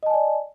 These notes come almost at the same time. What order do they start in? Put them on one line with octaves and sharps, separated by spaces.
D#5 A5 G#5 D5